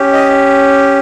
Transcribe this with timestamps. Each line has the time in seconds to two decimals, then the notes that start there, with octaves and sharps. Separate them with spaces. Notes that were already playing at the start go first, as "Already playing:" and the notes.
Already playing: C#4 G4
0.13 D#5